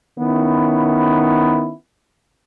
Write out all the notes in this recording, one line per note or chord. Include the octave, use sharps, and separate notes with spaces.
D#3 B3 C#4 E4